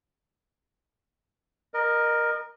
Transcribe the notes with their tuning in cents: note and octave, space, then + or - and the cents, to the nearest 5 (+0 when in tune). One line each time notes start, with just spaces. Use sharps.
A#4 +10 D#5 -25